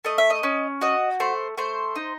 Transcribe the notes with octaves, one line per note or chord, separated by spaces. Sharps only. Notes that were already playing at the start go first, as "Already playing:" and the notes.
A3 D#5
E5
D#5
C#4
F#4 D#5
A3 C5
A3 C5
D#4